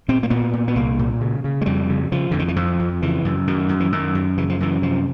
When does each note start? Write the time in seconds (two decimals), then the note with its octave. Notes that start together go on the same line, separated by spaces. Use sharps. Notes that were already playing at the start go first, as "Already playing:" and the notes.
0.08 A#2 C4
0.23 A#3
0.30 A#2 B3
0.53 A#2
0.68 B3
0.75 C2 A#3
0.99 A#2
1.21 C#3
1.44 C#3
1.61 G#3
1.66 F2 G3
1.89 C#3
2.12 C#3 F3
2.31 F2 D3
2.39 D#3
2.48 E3
2.56 F2 F3
2.80 F2
3.02 C#3 E3
3.25 F#2
3.47 F#2 D#3
3.69 F#2
3.80 E3
3.92 F#2 D#3
4.15 F#2
4.38 C#3 E3
4.49 F3
4.60 F#2 E3
4.82 C3 F3